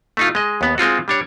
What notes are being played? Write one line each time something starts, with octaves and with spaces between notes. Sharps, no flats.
A3 D#4 F4
G#3 D#5
D#2 B3
G#3 C4 F4 F#4
G3 D4 C#5